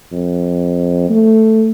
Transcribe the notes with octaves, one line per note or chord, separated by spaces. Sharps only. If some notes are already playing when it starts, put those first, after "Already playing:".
F2
A3